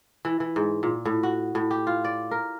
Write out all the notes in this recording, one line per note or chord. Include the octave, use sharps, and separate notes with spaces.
E3
E3
G#2
A#2
A2
F#4
A2
G4
F4
D5
A#4